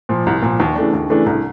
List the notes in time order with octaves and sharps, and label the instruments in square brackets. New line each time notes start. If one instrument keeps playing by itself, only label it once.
[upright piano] A#2 F3
C2
A#2 F3
D#2
C#3 E3 A3 D4
D#2
C#3 E3 A3 D4
C2